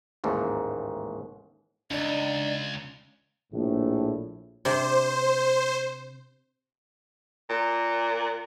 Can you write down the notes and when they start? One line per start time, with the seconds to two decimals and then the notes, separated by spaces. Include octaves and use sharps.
0.24 A1 D#2 G#2 A3
1.91 C#2 D4 D#4 D5
3.52 A#1 A2
4.65 C3 D4 C5
7.49 A#2